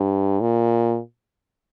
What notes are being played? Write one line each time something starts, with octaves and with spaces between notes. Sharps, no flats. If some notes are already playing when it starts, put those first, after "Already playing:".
Already playing: G2
A#2